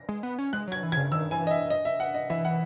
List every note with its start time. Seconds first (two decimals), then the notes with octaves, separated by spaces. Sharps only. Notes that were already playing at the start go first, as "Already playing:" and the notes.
Already playing: A#6
0.09 G#3
0.23 B3
0.38 C#4
0.53 G#3 F#6
0.67 F#3 G#6
0.83 E3
0.92 C#3 G#6
1.12 D#3 E6
1.31 E3 G#5
1.47 D#5
1.51 E5
1.70 D#5
1.85 E5
2.00 F#5
2.14 D#5
2.30 E3 E5
2.45 F#5